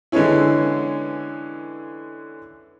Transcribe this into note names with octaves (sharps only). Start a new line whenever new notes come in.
D3 E3 G#3 B3 C#4 E4